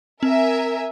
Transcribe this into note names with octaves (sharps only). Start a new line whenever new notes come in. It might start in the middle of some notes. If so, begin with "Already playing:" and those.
C4 A#4 E5 G#5